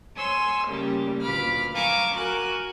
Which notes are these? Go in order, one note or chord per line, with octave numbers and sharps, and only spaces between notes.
C#5 G#5 C6 E6
C#3 G3 A3 A#3
D2 A#2 B4 B5 D6 F6
F5 G#5 A#5 C#6 D6 E6
F#4 A#4 G#5 F#6